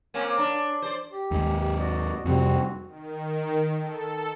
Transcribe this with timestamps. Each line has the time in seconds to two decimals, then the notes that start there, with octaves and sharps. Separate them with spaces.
0.14 A#3 C4 C#4
0.38 D4
0.82 C5 D5
1.12 G4
1.31 D#2 G#2 G#3
1.58 G4
1.80 F#4 D5 D#5
2.25 F2 C3 G3 C4 F#4
2.87 D#3
3.80 A4